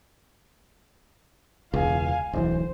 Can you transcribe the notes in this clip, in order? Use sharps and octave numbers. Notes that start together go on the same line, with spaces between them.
E1 C#2 F5 G#5
D1 B1 E3 C5